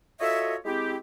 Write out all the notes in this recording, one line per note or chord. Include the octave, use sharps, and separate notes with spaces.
F4 F#4 A4 C#5 D#5 E5
G#3 C4 E4 G4